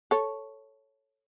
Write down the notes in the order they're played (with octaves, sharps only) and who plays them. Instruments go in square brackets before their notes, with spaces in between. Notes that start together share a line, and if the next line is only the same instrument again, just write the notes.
[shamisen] A4 C#5